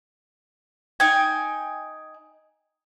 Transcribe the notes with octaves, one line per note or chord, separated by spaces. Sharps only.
D#4 G5 G#5